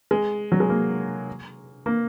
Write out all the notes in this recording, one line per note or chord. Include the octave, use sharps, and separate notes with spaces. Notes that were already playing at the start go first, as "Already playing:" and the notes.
G#3
F#3
G#3
A#3
A#3